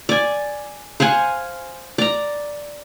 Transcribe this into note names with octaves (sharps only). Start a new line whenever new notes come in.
D5 G#5
C5 F5 F#5 G#5
D5 A#5